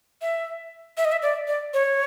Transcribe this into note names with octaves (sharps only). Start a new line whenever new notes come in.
E5
E5
D#5
E5
D5
D5
C#5